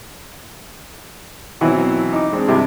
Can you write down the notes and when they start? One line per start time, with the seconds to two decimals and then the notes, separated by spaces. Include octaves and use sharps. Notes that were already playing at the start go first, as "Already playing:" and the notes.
1.61 B2 E3 F#3 C4 E4
2.13 D#4 D6
2.32 G#3 C4 D4
2.48 G2 C3 E4